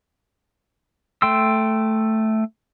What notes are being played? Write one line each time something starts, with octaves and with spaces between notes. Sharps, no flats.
A3 G5 C6 E6